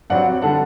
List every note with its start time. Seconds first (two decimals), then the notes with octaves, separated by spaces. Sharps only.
0.10 G2 F#3 C4 D5 F#5
0.42 D3 G3 F#5 A5